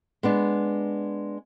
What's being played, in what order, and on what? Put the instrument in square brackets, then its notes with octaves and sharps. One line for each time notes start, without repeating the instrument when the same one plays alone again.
[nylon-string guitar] G#3 B3 D4